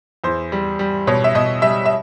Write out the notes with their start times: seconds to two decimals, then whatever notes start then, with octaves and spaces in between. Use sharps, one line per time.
0.24 E2 C5
0.52 G3
0.79 G3
1.07 B2 C#5
1.24 E5
1.35 B2 D#5
1.62 G3 E5
1.86 E5